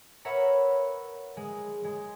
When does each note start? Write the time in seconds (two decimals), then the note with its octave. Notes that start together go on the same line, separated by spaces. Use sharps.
0.25 A#4 B4 C#5 E5 F#5 A#5
1.37 G#3
1.84 G#3